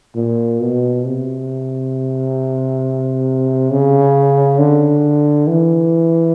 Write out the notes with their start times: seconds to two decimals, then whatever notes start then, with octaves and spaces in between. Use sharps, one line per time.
0.15 A#2
0.60 B2
1.04 C3
3.70 C#3
4.59 D3
5.47 E3